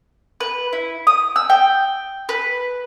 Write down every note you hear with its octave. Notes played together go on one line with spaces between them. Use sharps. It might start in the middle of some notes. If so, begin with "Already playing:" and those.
B4
E4
D#6
E6
G5
B4